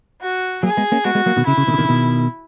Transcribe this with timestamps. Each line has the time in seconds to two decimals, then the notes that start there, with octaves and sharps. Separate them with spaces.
0.22 F#4
0.63 F#3 A#3 G#4
0.77 G#3 B3
0.92 A#3 C#4
1.05 G#3 B3 F#4
1.15 G#3 B3
1.26 F#3 A#3
1.36 B2 D#3
1.46 C#3 E4
1.58 C#3
1.68 B2 D#3
1.74 C#3
1.78 B2 D#3
1.84 C#3
1.89 B2 D#3